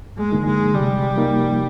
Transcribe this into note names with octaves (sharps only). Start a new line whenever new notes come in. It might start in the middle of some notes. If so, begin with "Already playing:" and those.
Already playing: G2
G#3
D3 F3 A#3 D#4
G#3
C3 G3
F3 A#3 D#4